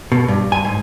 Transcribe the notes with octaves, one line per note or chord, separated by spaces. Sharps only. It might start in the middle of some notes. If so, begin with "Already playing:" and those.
B2
G2
G#5
G#2